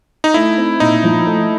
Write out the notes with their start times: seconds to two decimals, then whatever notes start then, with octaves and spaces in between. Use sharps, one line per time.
0.24 D#4
0.34 A3 E4
0.58 C4
0.80 A#2 D#4
1.04 F3
1.27 A3